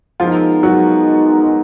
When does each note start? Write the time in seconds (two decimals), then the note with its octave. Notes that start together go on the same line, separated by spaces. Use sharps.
0.19 F3 G#3 B3 D#4 F4 A#4
0.63 F#3 F#4